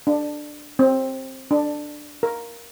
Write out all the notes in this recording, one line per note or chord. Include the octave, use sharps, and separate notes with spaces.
D4
C4
D4
A#4